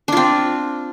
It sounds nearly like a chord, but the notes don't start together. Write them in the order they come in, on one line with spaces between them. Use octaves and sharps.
D4 F4 C4